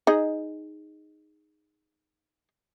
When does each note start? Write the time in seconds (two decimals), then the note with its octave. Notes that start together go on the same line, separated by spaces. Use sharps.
0.07 D#4 G#4 D#5